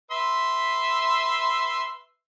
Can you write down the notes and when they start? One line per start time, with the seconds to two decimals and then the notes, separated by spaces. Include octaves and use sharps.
0.11 B4 E5 C6